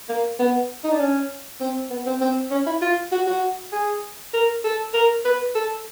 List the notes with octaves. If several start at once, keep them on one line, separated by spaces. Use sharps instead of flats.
A#3
B3
D#4
D4
C#4
C4
B3
C4
C4
C#4
E4
F4
F#4
F#4
G#4
A#4
A4
A#4
B4
A4